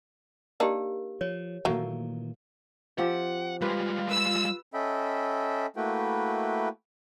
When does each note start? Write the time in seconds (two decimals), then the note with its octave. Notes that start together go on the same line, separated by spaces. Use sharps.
0.60 A#3 D4 D#4 G4 A#4
1.21 F3 C#5
1.65 A#2 D#3 E3 F#3 A3 A#3
2.98 F3 C4 G4 F#5
3.61 G3 G#3 F4 G4 B4
4.10 B4 E6
4.74 C#4 A4 D#5 E5 G5 B5
5.76 A3 A#3 E4 F#4 B4 G5